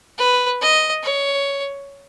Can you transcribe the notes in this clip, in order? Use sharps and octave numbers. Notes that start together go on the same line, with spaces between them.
B4
D#5
C#5